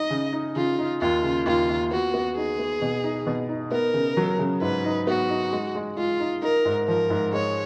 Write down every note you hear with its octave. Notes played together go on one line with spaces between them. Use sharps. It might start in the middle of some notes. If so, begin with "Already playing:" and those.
Already playing: D#4 D#5
C#3
D#4
C#3 F4
D#4
D#2 F4
C#3
D#2 F4
D#2
B3 F#4
B3
D#4 G#4
B3
B2
D#4
B2
D#4
B3 A#4
C#3
F#3
C#3
G#2 B4
D#4
B3 F#4
D#4
G#3
G#3
G#3 F4
D#4
D#4 A#4
G#2
F3 A#4
G#2
G#3 C#5